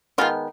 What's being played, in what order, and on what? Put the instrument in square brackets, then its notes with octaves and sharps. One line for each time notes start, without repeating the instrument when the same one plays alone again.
[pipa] D#3 G#3 B3 F4